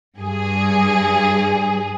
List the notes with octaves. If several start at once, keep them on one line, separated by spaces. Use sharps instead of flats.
G2 G#4